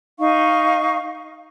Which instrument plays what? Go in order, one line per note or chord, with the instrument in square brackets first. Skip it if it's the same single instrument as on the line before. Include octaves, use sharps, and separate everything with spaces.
[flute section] D#4 F5 C#6